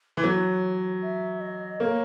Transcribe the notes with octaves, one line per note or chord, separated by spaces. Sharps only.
E3
F#3 C#5
E5
D#5
A#3 C#5